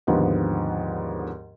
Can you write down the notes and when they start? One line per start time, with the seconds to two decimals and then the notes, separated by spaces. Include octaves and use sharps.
0.07 D#2 G#2 D3 F3 B3